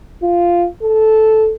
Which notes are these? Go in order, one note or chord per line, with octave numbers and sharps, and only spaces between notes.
F4
A4